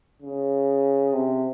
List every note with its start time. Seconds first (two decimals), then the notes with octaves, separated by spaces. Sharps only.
0.22 C#3
1.13 C3